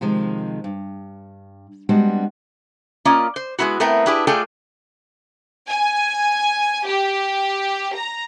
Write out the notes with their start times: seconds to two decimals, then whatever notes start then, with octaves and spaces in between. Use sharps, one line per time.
0.01 C3 D#3 F3 G#3
0.64 G2
1.89 G3 G#3 B3 C4 D4 F#4
3.05 A#3 C#4 F4 D5 D#5
3.36 C5
3.59 G#3 B3 C4 E4 F#4
3.80 A3 B3 C4 E4 A#4 G5
4.06 D4 E4 G4 G#4 B4
4.27 A3 F4 G#4 A4 D5 G5
5.69 G#5
6.88 G4
7.96 A#5